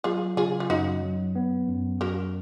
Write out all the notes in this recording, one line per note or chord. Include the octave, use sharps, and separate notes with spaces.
F#3 F4 G#4
C#3 F4 G#4
F4
F#2 D#4 F#4
F#3
B3
F#2
F#2 F#4 A#4